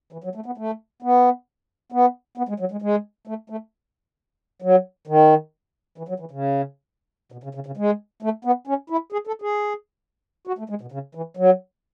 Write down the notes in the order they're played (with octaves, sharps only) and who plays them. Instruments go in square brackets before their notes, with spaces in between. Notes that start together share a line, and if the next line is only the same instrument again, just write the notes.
[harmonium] E3
F#3
A3
B3
A3
B3
B3
B3
G#3
F#3
G#3
G#3
A3
A3
F#3
D#3
E3
F#3
E3
C#3
B2
C#3
C#3
C#3
G#3
A3
B3
C#4
E4
G#4
A4
G#4
F#4
A3
G#3
B2
C#3
E3
F#3